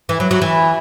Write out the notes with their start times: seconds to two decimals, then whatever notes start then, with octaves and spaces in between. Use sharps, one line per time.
0.09 E3
0.20 F#3
0.31 F#3
0.42 E3